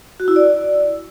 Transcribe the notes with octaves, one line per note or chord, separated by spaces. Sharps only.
F#4
E4
D5